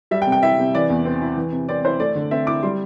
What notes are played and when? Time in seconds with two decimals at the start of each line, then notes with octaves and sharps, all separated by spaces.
0.11 G3 E5
0.22 G5
0.27 C3
0.32 G5
0.43 E4 E5
0.59 C3
0.74 E3 D5
0.90 E2
1.05 C4
1.21 E4
1.36 E3
1.52 C3
1.69 C4 D5
1.85 E4 C5
2.00 A3 D5
2.15 D3
2.31 C4 E5
2.47 E4 D6
2.63 G3 C6